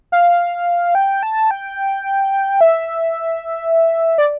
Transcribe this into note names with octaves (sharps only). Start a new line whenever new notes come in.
F5
G5
A5
G5
E5
D5